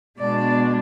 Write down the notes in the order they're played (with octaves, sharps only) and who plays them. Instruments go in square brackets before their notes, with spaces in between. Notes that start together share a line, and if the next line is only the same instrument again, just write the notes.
[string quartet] B2 G#3 B3 D4 D5